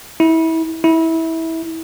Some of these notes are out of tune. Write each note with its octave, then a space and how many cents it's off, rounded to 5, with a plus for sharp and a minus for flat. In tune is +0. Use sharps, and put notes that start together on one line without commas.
E4 -25
E4 -20